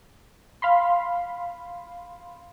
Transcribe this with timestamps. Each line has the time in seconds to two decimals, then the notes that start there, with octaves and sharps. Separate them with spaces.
0.62 F5 B5 C6